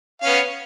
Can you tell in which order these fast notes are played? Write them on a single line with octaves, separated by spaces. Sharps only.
F5 C#4 B3